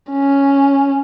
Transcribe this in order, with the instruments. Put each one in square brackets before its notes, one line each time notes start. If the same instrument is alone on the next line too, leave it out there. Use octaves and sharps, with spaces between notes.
[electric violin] C#4